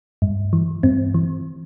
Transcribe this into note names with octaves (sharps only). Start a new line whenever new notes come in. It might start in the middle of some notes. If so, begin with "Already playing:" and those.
G2
E3
G2 C4
E3